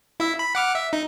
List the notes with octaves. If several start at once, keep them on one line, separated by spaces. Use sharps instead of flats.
E4 E5
B5
F#5 D6 F6
E5
D#4